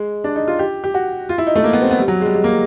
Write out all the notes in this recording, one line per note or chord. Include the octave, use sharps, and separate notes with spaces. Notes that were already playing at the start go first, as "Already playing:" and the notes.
Already playing: G#3
D4
D#4
F4
G4
G4
F#4
F4
E4
D#4
A3
A#3
B3
C4
B3
G3
F#3
G#3
G3
G#3
A#3